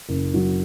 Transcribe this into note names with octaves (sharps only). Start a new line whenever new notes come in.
F#1
F#3